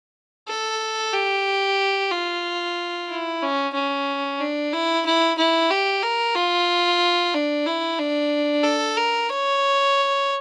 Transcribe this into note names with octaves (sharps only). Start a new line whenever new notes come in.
A4
G4
F4
E4
C#4
C#4
D4
E4
E4
E4
G4
A#4
F4
D4
E4
D4
A4
A#4
C#5